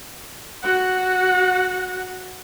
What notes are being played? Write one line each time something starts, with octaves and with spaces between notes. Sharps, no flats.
F#4 F#5